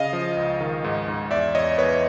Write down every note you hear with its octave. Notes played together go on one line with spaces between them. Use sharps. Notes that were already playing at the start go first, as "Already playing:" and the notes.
Already playing: C#3 D#5 F5
F3
C#2
D#3
G#2
G#2
E2 D5 E5
E2 C#5 D#5
E2 B4 C#5